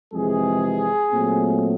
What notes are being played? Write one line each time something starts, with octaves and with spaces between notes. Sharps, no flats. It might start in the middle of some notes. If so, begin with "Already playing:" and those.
F2 C3 E3 G#3 G#4
A#2 F#3 A3 C4